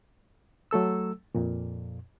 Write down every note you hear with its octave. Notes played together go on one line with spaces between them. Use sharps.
F#3 A3 A4 E6
F2 A#2